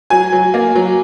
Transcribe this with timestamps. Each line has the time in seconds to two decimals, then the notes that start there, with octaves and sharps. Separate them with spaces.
0.10 F#3 G#5
0.32 F#3
0.54 A#3
0.75 F#3